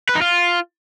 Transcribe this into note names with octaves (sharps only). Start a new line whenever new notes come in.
B4
D#4
F4